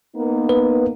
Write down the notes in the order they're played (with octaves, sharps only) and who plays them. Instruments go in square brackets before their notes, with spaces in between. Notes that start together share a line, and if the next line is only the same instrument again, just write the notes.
[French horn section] A#3 B3 D#4
[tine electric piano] B4